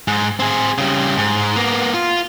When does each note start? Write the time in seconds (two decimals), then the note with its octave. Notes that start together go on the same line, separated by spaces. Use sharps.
0.08 G#2
0.39 C4 G#4
0.78 C#3 G3
1.18 G#2
1.56 A#3 B3
1.94 F4